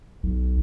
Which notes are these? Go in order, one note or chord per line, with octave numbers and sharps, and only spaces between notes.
B1